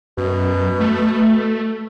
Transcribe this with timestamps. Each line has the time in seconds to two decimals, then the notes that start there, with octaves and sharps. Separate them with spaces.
0.18 F#2 B2
0.80 A3